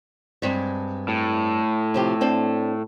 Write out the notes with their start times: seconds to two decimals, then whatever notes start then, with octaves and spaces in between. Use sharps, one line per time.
0.42 G2 G#3 C4
1.08 A2
1.94 C3 F3 G4
2.21 C4 D4 A4